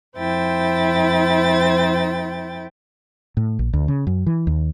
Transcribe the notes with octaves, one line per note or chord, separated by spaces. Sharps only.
F2 E4 C5 G5 A6
A2
A#1
D2
C#3
F#2
E3
D#2